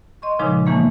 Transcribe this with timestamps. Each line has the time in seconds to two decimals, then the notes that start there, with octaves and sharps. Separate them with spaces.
0.22 D#5 C6 C#6
0.39 A#2 C#3 F3 G#3 D#4
0.66 F2 E3 G#3 A#3 B3 C#6